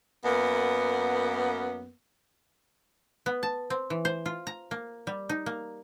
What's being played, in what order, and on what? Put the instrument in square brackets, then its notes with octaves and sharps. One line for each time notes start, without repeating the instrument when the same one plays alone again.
[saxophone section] F#2 A#3 B3
[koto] B3
A5
C4
E3
C5
F4
A#5
A#3
G3
D#4
A#3